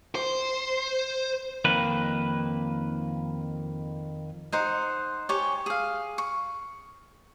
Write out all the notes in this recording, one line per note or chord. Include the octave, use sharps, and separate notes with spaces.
C5
F2 D#3 A#3 B4
D#4 C5 F#5
G4 C#5 G#5 C#6
G#4 F5
C#6